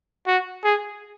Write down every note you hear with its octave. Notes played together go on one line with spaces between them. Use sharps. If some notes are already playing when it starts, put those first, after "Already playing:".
F#4
G#4